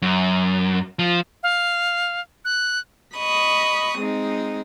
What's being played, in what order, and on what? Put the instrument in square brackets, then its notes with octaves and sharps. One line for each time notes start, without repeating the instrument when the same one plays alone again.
[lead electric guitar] F#2
F3
[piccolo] F5
F#6
[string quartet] D#5 B5 C#6 D#6
G#3 C4 D#4